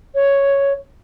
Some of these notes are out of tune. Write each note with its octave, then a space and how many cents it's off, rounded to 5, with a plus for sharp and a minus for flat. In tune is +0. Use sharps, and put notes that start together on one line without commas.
C#5 +0